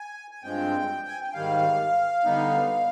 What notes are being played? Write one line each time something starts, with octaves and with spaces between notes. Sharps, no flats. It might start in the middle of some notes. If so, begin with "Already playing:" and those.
Already playing: G#5
G#5
G2 F3 G#3 C4 G5
G#5
G5
G#2 D#3 G3 F5
D3 G3 B3 D#4